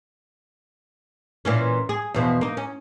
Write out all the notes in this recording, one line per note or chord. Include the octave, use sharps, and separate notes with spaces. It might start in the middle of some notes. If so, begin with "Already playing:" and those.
A#2 E3 C#4
G#4
E2 B2 F3
A#3 D#4
C#4